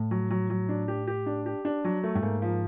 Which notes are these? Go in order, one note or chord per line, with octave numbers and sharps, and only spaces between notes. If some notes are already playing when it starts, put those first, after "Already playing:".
Already playing: A2
F#3
F#3
F#3
D4
G4
G4
D4
G4
D4
F#3
A3
G2
G#2 A#3
F3